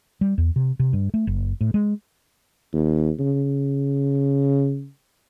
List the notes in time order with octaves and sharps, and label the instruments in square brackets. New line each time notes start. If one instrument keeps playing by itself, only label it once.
[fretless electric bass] G3
E2
C3
C3
G2
A3
F#1
A2
G#3
[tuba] D#2
C#3